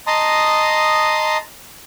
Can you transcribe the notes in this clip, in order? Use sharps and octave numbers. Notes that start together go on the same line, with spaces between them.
D#5 A5 A#5 C6 D#6